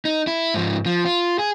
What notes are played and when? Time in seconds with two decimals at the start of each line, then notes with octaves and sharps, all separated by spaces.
0.05 D#4
0.27 E4
0.54 G#2 F3
0.86 F3
1.06 F4
1.39 G#4